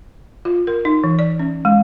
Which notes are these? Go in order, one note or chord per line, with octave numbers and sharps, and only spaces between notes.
F4
A#4
D#4
E3
D5
C#4
G#3